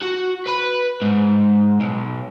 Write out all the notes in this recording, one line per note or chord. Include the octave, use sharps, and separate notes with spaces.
F#4
B4 B5
G#2
B1